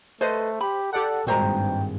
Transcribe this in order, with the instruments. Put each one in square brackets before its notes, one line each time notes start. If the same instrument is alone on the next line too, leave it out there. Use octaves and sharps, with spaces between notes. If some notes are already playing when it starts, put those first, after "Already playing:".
[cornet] A3 [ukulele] A4 B4 D#5 [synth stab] C5
[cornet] G4 [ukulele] B5
[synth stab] G4 D5 F#5 [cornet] A4
[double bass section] G#1 G2 [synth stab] A#2 G#3 [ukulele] F#4 C5 A#5 [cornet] G5